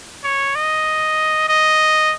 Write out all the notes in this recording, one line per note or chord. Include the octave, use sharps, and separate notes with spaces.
C#5
D#5
D#5